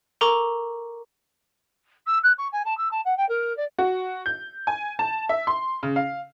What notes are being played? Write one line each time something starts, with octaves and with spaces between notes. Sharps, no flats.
A4 A#4 A#5 C#6 D6
E6
F#6
C#6
G#5
A5
E6
A5
F#5
G5
A#4
D5
F#4
G6
G#5
A5
E5
C6
C#3
F5